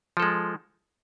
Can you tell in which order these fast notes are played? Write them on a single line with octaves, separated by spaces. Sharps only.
F3 A4 G#3